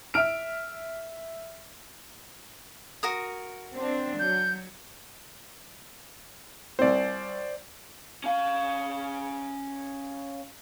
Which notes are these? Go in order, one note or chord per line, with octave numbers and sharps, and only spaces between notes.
E5 F6 D7
F#4 A#4 D#6
C4 D4
F#3 G6
C2 C4 C5 D5
C#4 F5